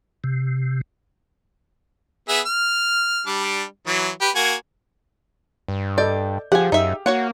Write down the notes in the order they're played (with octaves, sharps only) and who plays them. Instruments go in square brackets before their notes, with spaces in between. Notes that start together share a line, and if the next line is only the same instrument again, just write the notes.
[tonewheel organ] C3
[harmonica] B3 G#4 E5
F6
G3 D4
E3 F#3
G4 B4
A#3 F#4 G#5
[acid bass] G2
[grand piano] A4 D#5 G6 [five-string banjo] D5
[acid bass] F3 [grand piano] G4 G#4 F5 [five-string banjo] F#5 G#5
[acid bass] F#2 [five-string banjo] D#4 E5
[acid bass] A#3 [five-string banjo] F#4 C#5 F#5